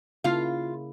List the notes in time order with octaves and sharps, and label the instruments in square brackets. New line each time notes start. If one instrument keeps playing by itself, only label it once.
[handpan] C#3 A#3 E4 [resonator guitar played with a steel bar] F4 F5